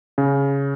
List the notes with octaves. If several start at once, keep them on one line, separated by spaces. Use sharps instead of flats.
C#3